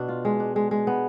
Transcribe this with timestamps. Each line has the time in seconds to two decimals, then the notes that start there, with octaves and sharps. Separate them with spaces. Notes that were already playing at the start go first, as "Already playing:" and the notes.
Already playing: B2 D4
0.08 F4
0.25 G#3
0.40 D4
0.56 G#3
0.71 G#3
0.87 B3